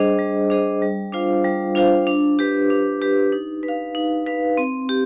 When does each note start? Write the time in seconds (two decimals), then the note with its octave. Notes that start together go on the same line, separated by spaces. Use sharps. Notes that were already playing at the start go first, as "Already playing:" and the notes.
Already playing: G3 D4 G#4 C5 D#5
0.19 G3
0.50 D4 G#4 C5 D#5
0.82 G3
1.13 D4 F4 C5 F5
1.44 G3
1.75 D4 F4 C5 F5
2.07 D4
2.39 G4 B4
2.70 D4
3.02 G4 B4
3.32 D#4
3.63 B4
3.68 F5
3.95 D#4
4.26 B4 F5
4.57 C4
4.89 G4